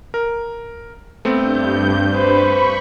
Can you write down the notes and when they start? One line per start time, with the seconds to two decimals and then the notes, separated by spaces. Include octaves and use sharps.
0.14 A#4
1.25 G2 A3 B3 C4 G6
2.13 B4 C5 B5 C#6